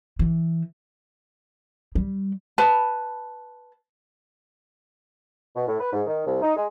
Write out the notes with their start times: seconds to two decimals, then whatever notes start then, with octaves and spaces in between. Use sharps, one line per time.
0.19 E3
1.95 G3
2.58 B4 A5
5.56 B2
5.68 A2
5.80 B4
5.93 G#2
6.07 D#3
6.26 C2
6.42 D#4
6.56 G#3